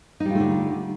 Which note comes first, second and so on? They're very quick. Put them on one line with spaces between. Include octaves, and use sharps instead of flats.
D#4 G3 F4 A3 D3